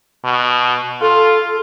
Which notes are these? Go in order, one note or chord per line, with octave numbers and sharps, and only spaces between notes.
B2
F4 A4